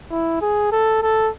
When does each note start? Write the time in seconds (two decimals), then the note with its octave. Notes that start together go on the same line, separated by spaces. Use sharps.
0.11 E4
0.42 G#4
0.72 A4
1.02 A4